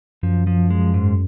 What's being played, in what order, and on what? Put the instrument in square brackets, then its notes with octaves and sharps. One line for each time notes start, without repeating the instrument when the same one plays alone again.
[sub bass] F#2 [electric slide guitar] F3
[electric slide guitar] F3
G#3
G#2